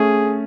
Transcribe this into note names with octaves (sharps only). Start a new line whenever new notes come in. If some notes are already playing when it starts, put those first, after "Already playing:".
Already playing: A3 C#4 G#4